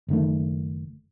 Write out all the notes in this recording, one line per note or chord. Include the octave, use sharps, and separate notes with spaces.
F#1 D#3 A3